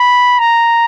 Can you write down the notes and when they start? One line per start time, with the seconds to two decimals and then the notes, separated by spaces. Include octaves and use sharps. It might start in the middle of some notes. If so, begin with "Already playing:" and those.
Already playing: B5
0.39 A#5